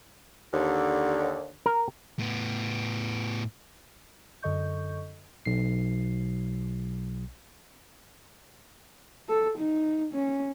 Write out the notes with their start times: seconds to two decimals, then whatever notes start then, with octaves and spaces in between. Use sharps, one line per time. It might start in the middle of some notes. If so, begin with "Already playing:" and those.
0.53 D#2 D3
1.66 A#4
2.19 A2 B3
4.42 F#2 D3 A4 D#5 C#6 G6
5.45 B1 C7
9.29 A4
9.58 D#4
10.14 C#4